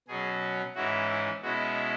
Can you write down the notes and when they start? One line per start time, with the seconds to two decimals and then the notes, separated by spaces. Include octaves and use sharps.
0.08 B2 F#3 C#4 G#4
0.75 G#2 E3 C#4 E4 F#4
1.09 E4
1.43 B2 G#3 C#4 E4 F#4